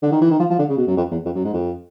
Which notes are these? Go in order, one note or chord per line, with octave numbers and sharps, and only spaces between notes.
D3
D#3
E3
D#3
F3
F3
D3
C#3
B2
F#2
F2
E2
F2
F#2
G#2
F2